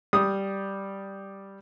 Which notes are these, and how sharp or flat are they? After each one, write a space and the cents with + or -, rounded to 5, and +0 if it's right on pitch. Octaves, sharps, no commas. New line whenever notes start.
G3 +0 D#6 +0